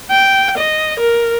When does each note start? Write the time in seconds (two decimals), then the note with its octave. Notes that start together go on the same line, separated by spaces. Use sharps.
0.11 G5
0.58 D#5
1.00 A#4